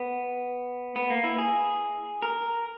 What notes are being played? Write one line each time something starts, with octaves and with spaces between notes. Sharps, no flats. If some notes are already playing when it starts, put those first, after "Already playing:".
Already playing: B3
B3
A#3
E4
G#4
A#4